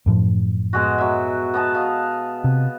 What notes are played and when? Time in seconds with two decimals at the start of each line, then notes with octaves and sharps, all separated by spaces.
0.06 F#2 A2 F3
0.73 B2 G#3 F#4
0.98 F#3 E5
1.54 B3 D#5 A5
1.74 F5
2.44 C3